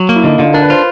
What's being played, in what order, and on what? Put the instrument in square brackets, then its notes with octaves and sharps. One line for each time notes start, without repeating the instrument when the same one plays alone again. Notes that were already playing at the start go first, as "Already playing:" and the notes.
Already playing: [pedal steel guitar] F#3
A#3
[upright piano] E4
[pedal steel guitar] D3 [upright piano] D#4
[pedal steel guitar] D3 [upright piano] F4
[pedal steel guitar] D4 [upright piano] A#4
[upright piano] B4
[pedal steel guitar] F4 [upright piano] C5